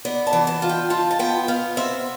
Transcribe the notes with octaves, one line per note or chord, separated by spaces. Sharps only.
B3 D5
A5
E3
A5
F4
G5
F4 A5
A5
B3 G5
B3 F5
C4 E5